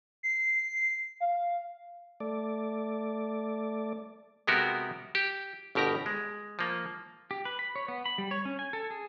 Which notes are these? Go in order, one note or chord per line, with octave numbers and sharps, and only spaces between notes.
C7
F5
A3 D5
C3 G#3 B3 F#4 G4 A#4
G4
G1 B2 G4 A#4 A#5
G#3
F3 A#3
G4
B4
B5
C#5
B3
B5
G3
C#5
C#4
G#5
A4
G#4